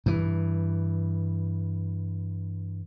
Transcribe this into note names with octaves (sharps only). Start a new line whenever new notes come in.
G2 E3